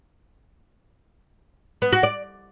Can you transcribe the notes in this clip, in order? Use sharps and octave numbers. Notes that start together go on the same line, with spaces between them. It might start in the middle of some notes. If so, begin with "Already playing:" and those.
B3
F#4
D5